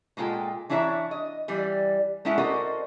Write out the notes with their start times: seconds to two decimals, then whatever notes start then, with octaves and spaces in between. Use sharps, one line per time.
0.17 A#2 G#3 F4 A4 G5
0.69 E3 D4 E4 C#5 E5 A#5
1.11 D#5
1.48 E3 G3 D5
2.25 G#3 A3 C#4 E4 E5 F#5
2.38 F#4 A4 A#4 C5 D5 D#5